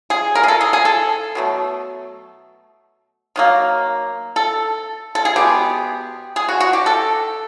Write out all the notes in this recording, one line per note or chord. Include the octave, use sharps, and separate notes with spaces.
G#4
A#4
G#4
A4
G#4
G#4
A4
B2 F#3 A3
D#3 F#3 A#3
A4
A4
G#4
B2 G#3 B3 G4
G#4
F#4
F#4
G4
A4